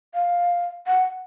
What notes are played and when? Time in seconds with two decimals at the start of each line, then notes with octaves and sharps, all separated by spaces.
0.14 F5
0.87 F#5